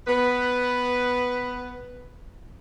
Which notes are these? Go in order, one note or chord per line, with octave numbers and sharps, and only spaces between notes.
B3 B4